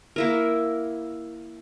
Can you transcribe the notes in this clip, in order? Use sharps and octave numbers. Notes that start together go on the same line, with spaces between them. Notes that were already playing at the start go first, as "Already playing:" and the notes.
A#3 E4 A#4